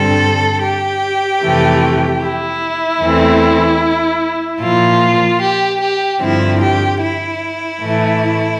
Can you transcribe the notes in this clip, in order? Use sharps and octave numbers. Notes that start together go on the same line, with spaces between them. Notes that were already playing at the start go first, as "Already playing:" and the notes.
Already playing: G2 D3 G3 C4 A4
G4
F2 C3 E3 A3
E4
E2 E3 A3 C4
A#2 F3 A#3 F4
G4
G4
G2 D3 F3 C4 E4
G4
E4
A2 E3 A3